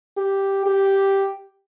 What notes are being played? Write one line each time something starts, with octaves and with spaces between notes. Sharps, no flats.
G4
G4